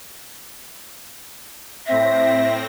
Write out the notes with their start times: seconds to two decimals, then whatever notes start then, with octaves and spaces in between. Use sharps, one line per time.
1.87 A2 C4 E5 A#6